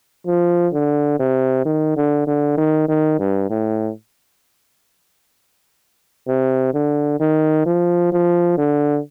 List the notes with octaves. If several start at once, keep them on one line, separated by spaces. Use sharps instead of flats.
F3
D3
C3
D#3
D3
D3
D#3
D#3
G2
A2
C3
D3
D#3
F3
F3
D3